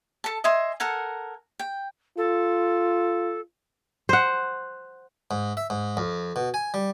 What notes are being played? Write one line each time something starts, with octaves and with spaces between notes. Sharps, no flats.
A4 A5
D#5 E5 G#5 C6
A4 A#4 F#5 G#5
G5
F4 A4
C5 F#5
G#2
E5
G#2
F2
B2
G#5
G3